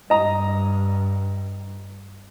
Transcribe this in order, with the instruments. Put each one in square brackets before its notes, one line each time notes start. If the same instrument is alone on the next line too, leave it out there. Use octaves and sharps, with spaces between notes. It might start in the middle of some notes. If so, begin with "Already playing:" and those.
[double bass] G2 [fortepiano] D#5 A#5